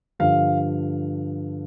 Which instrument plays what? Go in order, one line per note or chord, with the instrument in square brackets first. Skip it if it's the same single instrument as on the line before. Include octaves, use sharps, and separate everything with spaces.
[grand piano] G2 D3 F3 F5